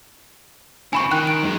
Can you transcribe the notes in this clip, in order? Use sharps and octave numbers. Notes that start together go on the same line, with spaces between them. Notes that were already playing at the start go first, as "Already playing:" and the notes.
C#2 C4 G#5 B5 C#6
D#3 G5 C6 F#6
D7
F#2 G#3